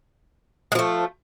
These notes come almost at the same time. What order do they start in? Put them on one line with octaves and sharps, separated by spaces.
G#3 F3 A3